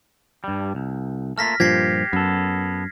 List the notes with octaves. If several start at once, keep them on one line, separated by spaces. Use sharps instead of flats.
G2 G3
C2
A3 A#3 F4 F6 A#6 B6
G2 A#2 F3 G4 G#6 A#6 C7
F#2 B3 A4